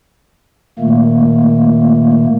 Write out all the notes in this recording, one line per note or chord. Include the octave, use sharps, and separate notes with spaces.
A#2 D#3 A3 A#3